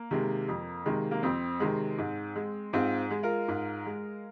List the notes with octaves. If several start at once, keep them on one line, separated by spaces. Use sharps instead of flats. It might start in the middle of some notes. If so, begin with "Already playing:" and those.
Already playing: A#3
C3 D#3 G#3
F2
C3 D#3 G#3
A#3
F2 C4
C3 D#3 G#3
G#2
G#3
G#2 C4 F4
G#3
F4 A#4
G#2
G#3